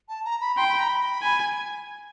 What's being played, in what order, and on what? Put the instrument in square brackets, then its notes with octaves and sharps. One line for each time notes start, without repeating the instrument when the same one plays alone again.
[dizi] A5
A#5
B5
[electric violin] G5 [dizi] C6
[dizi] B5
A#5
B5
[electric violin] G#5